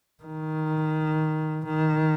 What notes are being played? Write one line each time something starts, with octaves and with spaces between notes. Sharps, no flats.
D#3
D#3